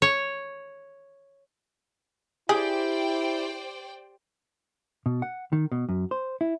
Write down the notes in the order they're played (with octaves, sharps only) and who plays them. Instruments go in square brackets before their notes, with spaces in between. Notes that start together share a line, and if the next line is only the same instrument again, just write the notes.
[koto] C#5
[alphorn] E4 [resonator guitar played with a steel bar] G4 [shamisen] G#4 [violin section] C5 D5 G5
[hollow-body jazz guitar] B2
F#5
D#3
B2
F#2
C5
E4